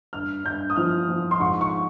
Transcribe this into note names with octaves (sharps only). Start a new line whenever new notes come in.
G2 F6
G2 G6
D#6
F3 F6
F3
C6
G#2 C#6
C#6